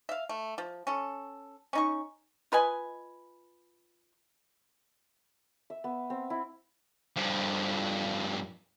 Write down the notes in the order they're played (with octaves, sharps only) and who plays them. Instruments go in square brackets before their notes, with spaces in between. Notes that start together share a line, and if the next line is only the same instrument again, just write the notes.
[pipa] E5 F5
A3
F3
C#4 A4
C#4 D#4 C#6
F4 B4 D#5 G#5
[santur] E5
B3
C4
E4
[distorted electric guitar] G2 F3